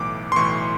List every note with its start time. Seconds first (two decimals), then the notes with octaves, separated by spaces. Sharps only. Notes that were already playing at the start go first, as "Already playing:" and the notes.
Already playing: B1 A2 E3 D6
0.32 C6
0.36 B1 A2 E3 C#6